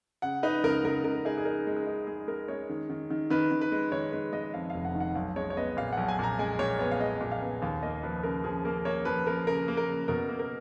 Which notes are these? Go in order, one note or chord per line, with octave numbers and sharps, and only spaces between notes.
C#3 F#5
D#4 B4
C#2 A#4
C#2 A#4
C#2 A#4
D#4 G#4
G#4
D#4 A#4
G#3
G#4
D#4
G#3 G#4
G#3 A#4
G#3 C#5
D#3
D#3
D#3
D#3 B4
D#3
B4
G#3
D#3 C#5
G#3 B4
G#3 D#5
F2 F5
F1 F5
F#5
D#3
F#5
B1 F5
G#3 C#5
C#5
B3 D#5
A#2 F5
B1 F#5
G#5
A#2 A#5
G#3 G#5
A#2 C#5
B3 C#5
F5
G#3 D#5
A#2
F5
B3
D#2 F5
A#3 D#5
F3 B4
C#3 A#4
F3 G#4
A#3 A#4
A#3 C#5
F3 B4
F3 A#4
C#3 A#4
A#3
A#4
C#3
B2 A#4
A#3
A#4